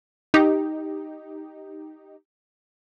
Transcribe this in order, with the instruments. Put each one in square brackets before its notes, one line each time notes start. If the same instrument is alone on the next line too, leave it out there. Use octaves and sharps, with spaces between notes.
[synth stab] D#4 G4